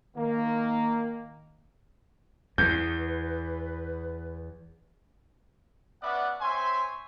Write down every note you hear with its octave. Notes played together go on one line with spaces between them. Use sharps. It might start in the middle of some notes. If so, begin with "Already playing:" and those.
D#3 A#3
E2 B4 G6
B3 C#4 B4 D5 E5 F#5
C4 C#5 E5 G#5 C6